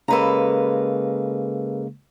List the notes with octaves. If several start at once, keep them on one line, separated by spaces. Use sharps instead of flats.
C#3 G#3 A#3 A4 B4 A#5